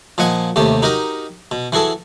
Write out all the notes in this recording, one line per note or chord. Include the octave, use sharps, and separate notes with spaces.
A#2 F3 D#5 F#5 G#5
D#2 C3 A3 G4
D#4 F#4 G4 A#4 D#5
B2
E3 F#4 G#4 A4